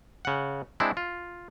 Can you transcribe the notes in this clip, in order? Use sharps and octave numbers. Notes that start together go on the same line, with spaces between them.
C#3 F#5
G#3 C4 D4 E4
F4